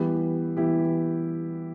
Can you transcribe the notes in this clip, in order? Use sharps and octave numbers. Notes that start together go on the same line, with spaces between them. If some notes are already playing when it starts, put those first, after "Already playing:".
Already playing: E3 G3 B3 E4 G4
E3 G3 B3 E4 G4